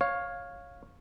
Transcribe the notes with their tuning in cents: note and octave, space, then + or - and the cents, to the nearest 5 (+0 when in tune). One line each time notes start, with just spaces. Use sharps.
C#5 -5 F5 +10